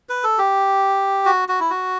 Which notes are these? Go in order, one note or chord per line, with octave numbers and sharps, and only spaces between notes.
B4
A4
G4
F#4
F#4
E4
F#4